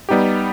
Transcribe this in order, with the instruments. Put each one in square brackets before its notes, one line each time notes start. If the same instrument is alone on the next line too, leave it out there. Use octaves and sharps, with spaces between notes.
[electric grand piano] G3 B3 D#4 G4